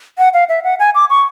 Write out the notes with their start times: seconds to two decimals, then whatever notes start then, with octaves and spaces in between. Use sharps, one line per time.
0.18 F#5
0.34 F5
0.49 E5
0.64 F#5
0.79 G#5
0.95 D6
1.10 C#6